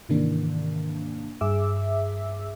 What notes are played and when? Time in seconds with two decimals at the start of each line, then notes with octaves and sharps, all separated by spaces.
0.09 G#2 C3 D#3 E3 A#3 D4
1.41 G2 G#4 E5 D6 E6